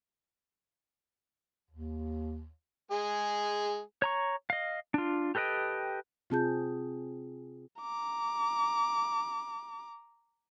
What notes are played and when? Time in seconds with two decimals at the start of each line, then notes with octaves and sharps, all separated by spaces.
1.70 D#2
2.91 G#3 G#4
4.02 C#5 A#5 C#6
4.50 D#5 F5
4.94 D4 F4
5.35 G4 A4 B4 D#5 G5
6.30 C3 C4 F4 G#4 A5 G6
7.82 A#5 D6